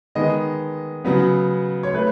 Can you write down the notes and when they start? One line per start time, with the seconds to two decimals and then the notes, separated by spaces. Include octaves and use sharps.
0.15 D#3 G#3 B3 D#5
1.05 C#3 F#3 B3
1.83 C#5
1.94 A3 B4